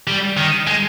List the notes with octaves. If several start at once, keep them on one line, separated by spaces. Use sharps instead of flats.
G3
D#3
G#3